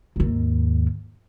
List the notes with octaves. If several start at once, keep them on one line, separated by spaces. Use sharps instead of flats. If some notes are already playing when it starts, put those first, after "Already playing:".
D#2 G#2